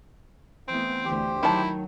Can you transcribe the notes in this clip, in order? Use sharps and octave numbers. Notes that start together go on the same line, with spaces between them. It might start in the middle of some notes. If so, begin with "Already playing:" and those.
E3 A3 B3 C4
D2 D3 E3 G4 C5 G5
D#3 F#3 E4 A5